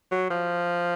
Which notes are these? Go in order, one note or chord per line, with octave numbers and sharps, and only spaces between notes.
F#3
F3